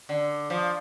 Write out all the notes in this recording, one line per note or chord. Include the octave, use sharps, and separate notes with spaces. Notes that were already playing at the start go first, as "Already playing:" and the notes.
D3
F3